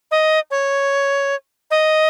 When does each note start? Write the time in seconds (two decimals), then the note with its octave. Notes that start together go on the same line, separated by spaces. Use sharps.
0.11 D#5
0.51 C#5
1.71 D#5